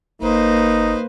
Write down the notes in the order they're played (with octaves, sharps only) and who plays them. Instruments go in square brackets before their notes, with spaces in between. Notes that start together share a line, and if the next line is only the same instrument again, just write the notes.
[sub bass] G1 [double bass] A#3 [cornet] D#4 [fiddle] B4 C5